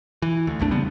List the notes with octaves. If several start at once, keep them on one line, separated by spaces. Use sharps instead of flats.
E3
D2
A#1 E2 A3 D4
C#3 G3 B3 C4